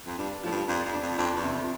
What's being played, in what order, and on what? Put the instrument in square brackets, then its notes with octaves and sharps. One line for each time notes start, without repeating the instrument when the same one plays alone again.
[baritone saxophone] F2
[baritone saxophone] G2 [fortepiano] D4
[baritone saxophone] A2 [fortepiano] F3
[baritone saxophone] G2
[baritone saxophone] F2 [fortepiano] D4
[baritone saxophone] F2
[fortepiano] D4
[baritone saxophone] F2
[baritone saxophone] F2 [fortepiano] D4
[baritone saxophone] E2
[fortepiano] C3
[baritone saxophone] F2